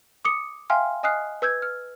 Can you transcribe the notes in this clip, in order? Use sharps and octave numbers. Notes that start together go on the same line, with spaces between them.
D6 D#6 C#7
E5 F5 G5 G#5 C6 F6
D#5 G#5 D#6 F6 F#6 C7
B4 E6 G6 G#6
F6